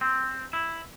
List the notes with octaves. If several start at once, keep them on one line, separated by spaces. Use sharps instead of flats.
C4
E4